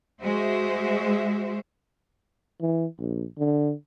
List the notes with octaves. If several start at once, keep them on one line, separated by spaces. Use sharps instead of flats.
G#3 F#4 C5 E5
E3
A#1
D3